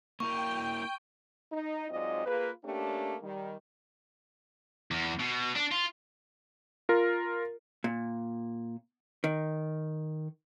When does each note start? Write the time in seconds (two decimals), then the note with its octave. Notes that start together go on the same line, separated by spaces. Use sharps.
0.20 A#3 E4 A#4 G5 C#6
1.52 D#4
1.90 G#2 F#3 C4 F4 D5 D#5
2.25 A#3 F4 G#4 B4
2.64 A3 A#3 C#4 D4 G4
3.22 D#3 G3
4.91 E2
5.20 B2
5.55 D4
5.72 F4
6.89 F4 A#4
7.84 A#2
9.24 D#3